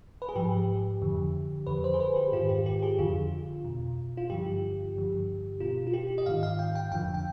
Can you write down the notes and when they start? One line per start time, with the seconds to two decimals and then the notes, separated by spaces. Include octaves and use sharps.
0.22 B4
0.29 G#4
0.35 G#2 F3 G4
1.02 F2 D3 F3
1.67 F2 D3 F3 B4
1.84 C5
1.94 G#4
2.00 B4
2.16 G4
2.32 G#2 D#3 F4
2.49 G4
2.66 G4
2.83 G#4
2.98 F2 D3 F3 F4
3.65 B2
4.17 F4
4.30 G2 D3 F3 G4
4.96 G2 D3 F3
5.60 B2 F4
5.87 F4
5.93 G4
6.18 D#5
6.26 G#2 D#3 F5
6.43 F5
6.59 G5
6.75 G5
6.92 F2 D3 F3 G5
7.14 G5